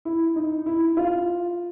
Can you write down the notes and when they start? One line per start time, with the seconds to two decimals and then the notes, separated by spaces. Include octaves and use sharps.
0.05 E4
0.36 D#4
0.66 E4
0.97 F4